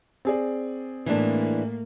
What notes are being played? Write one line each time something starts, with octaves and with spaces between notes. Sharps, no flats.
C4 G#4 D5
A2 E3 G#3 A#3 D4